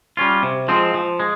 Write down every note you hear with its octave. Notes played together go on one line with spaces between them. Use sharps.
G3 C#4 F4
C3
F3 G#3 C4
F3
G#3